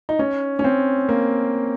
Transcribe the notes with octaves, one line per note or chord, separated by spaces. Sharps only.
D#4
C#4
C#4
C4
A#3